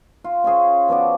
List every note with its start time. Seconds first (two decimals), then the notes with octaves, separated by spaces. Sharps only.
0.24 F4
0.44 C#4 F4 G#4 C5
0.88 F3 B3 F#4 D5